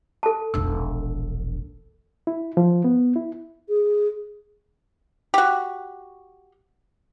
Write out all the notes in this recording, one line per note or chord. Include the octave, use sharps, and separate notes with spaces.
A4 A5
E1 A#1 E6
E4
F3
B3
E4
G#4
F#4 G4